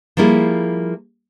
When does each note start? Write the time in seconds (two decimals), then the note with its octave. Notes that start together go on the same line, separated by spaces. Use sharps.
0.17 F3 G3 A#3 E4 G#4